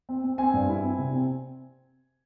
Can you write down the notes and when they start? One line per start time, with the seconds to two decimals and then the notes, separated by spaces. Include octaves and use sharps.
0.09 C4
0.24 C4
0.38 C4 G#5
0.53 G2
0.69 E4
0.84 C4
0.98 C3
1.14 C4